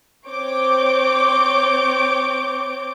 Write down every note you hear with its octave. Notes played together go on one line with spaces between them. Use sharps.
C4 C#5 D6 G6 D7